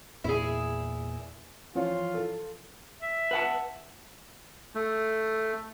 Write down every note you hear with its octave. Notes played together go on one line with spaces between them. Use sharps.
E2 A#2 E4 G#4
E3 F3 F4 C#5
A4
E5
B4 F#5 A5
A3